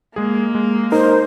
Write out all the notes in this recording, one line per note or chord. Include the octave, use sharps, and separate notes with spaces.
G#3 A#3 G#4
G#3
D#4 A#4 C5